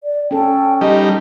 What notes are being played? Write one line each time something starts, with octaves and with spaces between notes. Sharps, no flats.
D5
C#4 A4 G5
G3 D#4 D#5